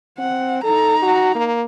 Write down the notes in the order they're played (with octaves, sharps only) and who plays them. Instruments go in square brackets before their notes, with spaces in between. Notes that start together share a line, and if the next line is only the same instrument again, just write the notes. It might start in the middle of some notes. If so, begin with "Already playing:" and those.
[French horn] C4 [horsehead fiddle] F#5
[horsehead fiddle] D#4 A#5 [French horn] A4
[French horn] F#4
A#3